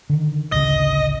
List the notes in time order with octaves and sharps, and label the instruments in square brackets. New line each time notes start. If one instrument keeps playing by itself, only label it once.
[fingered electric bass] D3 D#3
[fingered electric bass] A1 D2 C#3 [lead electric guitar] D#5